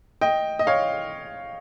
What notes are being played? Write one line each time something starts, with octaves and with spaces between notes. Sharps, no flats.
D#5 G5
D#5
C#5 F5